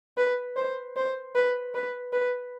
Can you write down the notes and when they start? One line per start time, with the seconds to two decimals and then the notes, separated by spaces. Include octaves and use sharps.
0.17 B4
0.56 C5
0.96 C5
1.35 B4
1.74 B4
2.13 B4